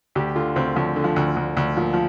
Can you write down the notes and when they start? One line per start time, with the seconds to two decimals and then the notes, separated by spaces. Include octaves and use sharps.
0.15 D2 G4
0.36 D3 F4
0.56 D2 C4
0.76 D2 F3
0.96 D3
1.04 F3
1.16 D2
1.36 D2
1.57 D2
1.77 A#2 F3
1.93 F3